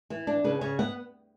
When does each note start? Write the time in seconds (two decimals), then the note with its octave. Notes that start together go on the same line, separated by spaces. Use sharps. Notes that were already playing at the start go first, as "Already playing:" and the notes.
0.10 E3
0.27 D4
0.44 C#3 B4
0.61 C#3 C#5
0.79 B3 F#5